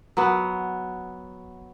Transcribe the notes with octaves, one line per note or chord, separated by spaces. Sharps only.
F#3 B3